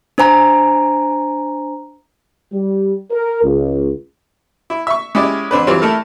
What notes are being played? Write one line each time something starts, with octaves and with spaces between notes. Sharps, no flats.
D4 C5 G#5 A#5
G3
A#4
C#2
E4
E5 C#6
G#3 C#4 E4 G4 D5
A1 C4 D4 B4
E3 F#3 G3 C4 F4
A3 E4 A4 A#4